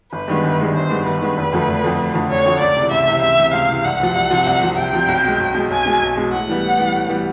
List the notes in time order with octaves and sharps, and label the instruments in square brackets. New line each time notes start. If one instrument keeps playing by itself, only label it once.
[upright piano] G1 [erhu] B4
[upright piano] G2 D#3 G#3 B3
G1
G2 D#3 G#3 B3
[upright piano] G1 [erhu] C5
[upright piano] G2 D#3 G#3 B3
[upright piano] G1 [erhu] B4
[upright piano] G2 D#3 G#3 B3
F1
F2 D3 F3 A3
F1
F2 D3 F3 A3
F1
F2 D3 F3 A3
[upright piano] F1 [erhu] C#5
[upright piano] F2 D3 F3 A3
[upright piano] C#2 [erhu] D5
[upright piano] C3 E3
[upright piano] C#2 [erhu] E5
[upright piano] C3 E3
[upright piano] C#2 [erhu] E5
[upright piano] C3 E3
[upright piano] C#2 [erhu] F5
[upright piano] C3 E3
[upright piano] C2 [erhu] F#5
[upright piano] C3 F3
C2
C3 F3
C2
C3 F3
[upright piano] C2 [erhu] G5
[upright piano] C3 F3
B1
B2 G#3
B1
B2 G#3
[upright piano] B1 [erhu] G#5
[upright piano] B2 G#3
B1
B2 G#3
[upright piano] A2 [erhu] F#5
[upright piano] E3 G3 B3
A2
E3 G3 B3
A2
E3 G3 B3